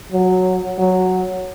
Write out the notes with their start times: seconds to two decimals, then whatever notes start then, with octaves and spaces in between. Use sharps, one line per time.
0.12 F#3
0.78 F#3